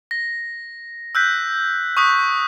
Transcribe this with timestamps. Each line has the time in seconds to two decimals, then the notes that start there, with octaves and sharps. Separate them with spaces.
0.11 A#6
1.15 E6 F#6 G6 B6
1.97 C#6 D#6 F#6 B6